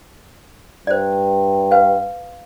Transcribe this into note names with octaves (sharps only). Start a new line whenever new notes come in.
G2 C5 D5
B4 F5